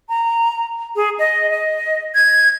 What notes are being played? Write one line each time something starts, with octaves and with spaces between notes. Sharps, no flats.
A#5
G#4
D#5
D#5
G#6